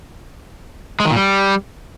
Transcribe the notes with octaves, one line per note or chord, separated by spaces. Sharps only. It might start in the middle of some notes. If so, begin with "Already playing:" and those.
G#3
D#3
A#2
G3